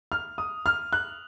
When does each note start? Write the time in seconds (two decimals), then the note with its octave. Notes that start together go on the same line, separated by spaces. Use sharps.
0.12 F6
0.38 D#6
0.66 F6
0.93 F#6